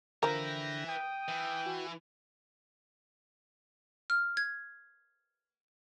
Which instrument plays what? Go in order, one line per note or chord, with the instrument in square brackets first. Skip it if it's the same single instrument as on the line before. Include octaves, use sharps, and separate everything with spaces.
[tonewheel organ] D3 G5 A#6 [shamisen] F3 A#4 [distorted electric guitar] B4 E5
[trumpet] G5 [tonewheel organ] D#6
[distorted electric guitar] E3
[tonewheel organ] F#4
[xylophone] F6
G#6